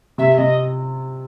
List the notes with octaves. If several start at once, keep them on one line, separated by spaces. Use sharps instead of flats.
C3 E5
C3 D#5